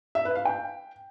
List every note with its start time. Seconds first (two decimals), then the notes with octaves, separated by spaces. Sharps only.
0.15 E5
0.25 B4
0.35 F5
0.45 G5